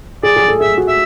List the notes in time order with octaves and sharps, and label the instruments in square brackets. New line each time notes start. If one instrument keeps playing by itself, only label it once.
[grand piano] G#4 [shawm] D5
[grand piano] G#4
A4
[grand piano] G#4 [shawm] E5
[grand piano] F#4
[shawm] E5